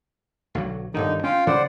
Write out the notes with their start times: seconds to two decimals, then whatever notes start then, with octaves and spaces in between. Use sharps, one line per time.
0.55 B1 D3 F#3
0.94 G1 C2 D3 D#3 D#4
1.24 C#4 F4 F5 G5
1.47 C#3 C5 D5 F#5